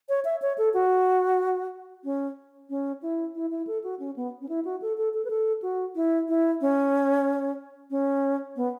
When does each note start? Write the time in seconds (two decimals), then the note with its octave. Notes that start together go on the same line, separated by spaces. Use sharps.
0.09 C#5
0.25 E5
0.42 C#5
0.58 A4
0.74 F#4
2.04 C#4
2.70 C#4
3.02 E4
3.35 E4
3.51 E4
3.67 A4
3.84 F#4
4.00 C#4
4.16 B3
4.42 C#4
4.49 E4
4.65 F#4
4.82 A4
4.98 A4
5.14 A4
5.25 B4
5.30 A4
5.62 F#4
5.95 E4
6.28 E4
6.61 C#4
7.91 C#4
8.56 B3